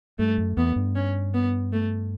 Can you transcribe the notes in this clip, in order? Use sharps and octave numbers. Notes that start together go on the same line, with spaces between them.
G2 A3
F#2
E2 B3
G2
C#4
B3
A3